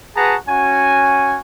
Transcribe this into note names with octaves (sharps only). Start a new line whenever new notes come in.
F#4 G#4 B4 F#5 A5 A#5
C#4 F#4 G#5